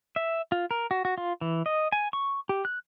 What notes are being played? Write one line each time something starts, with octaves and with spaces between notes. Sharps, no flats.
E5
F4
A#4
F#4
F#4
F4
E3
D#5
G#5
C#6
G4
F#6